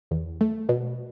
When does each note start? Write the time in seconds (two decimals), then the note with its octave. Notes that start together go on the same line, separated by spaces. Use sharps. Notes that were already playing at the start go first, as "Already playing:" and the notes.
0.11 E2
0.41 A3
0.69 B2